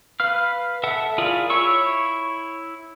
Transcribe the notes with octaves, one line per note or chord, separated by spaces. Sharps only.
B4 F5 F6
A4 E5 F#5
E4 F4 G#4 A#4 D5
E4 C#5 C#6 E6